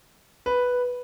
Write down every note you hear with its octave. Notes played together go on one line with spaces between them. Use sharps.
B4